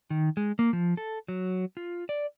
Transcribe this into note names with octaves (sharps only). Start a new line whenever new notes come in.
D#3
G#3
A#3
F3
A4
F#3
F4
D5